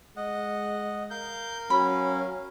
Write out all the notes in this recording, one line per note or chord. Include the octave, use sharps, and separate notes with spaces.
G#3 D#5 F#5
A#4 F5 G6
F#3 C#4 B5